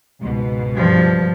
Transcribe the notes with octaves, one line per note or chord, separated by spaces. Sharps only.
C#2 G#2 B2
G2 F3